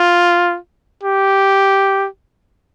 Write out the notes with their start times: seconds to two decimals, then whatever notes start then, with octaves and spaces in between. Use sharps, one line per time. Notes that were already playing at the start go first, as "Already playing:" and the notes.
Already playing: F4
1.03 G4